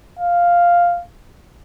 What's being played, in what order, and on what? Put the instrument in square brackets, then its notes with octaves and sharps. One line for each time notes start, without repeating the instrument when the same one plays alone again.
[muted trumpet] F5